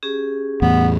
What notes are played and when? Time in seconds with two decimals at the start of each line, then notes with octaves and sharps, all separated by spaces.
0.03 C#4 G4 G#4
0.62 E2 A2 B3